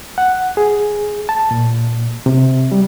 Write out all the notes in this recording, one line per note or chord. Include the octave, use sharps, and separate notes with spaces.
F#5
G#4
A5
A#2
C3
G3